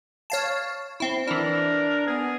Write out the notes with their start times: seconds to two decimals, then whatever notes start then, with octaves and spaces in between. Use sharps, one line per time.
0.30 C#5 F5 A5
1.00 C4 E4
1.28 E3 D4 E4 A#4
2.07 B3 G#4